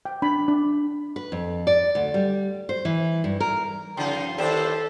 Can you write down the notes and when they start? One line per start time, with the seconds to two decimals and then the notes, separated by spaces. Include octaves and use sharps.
0.05 G5
0.22 D4 B5
0.48 D4
1.16 B4
1.32 F2
1.67 D5
1.95 D2
2.14 G3
2.69 C5
2.85 E3
3.24 G2
3.40 A#4
3.97 G2 C#3 F3 D#4 F#5 G5 C6
4.38 D#2 E4 G4 A4 C5 D5 G5 E7